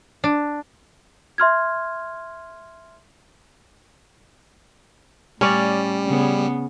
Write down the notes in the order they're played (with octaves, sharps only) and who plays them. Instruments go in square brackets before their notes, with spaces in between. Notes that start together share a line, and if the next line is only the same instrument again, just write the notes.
[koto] D4
[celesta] E5 C6 F6 G#6
[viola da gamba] A2 [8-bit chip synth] G3 [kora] C#4 D5
[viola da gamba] C#3 B3